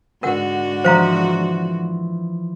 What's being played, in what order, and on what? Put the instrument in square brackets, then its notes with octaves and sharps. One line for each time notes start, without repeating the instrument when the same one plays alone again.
[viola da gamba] G#2 D3 F#4 [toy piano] A#4 F#5
[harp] E3 F3 [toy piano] C5 F5 A#5